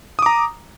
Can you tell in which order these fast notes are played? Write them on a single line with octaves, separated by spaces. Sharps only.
D#6 D6 A#5